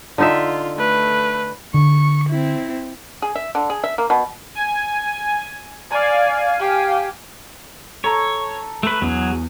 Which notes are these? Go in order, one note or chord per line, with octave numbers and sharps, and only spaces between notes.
D3 D#4 F4 E5
A3 B4
D3 C#6
C4 E4
G#4
E5
D3
G#4
E5
A#3
B2
G#5
D5 F5 G#5
G4
A4 C#5 A5 A#5
A3 B4
E2 F#3 G#4